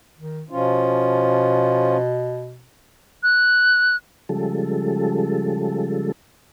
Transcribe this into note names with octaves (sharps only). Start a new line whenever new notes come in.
D#3
B2 F3 C#4 F4
F#6
C#3 F3 G3 G#3 A4